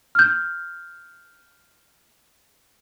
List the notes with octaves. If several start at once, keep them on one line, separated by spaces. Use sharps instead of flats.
F6 G6